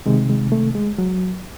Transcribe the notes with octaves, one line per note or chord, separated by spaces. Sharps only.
C3 D#3 G#3
G#3
A3
G#3
F#3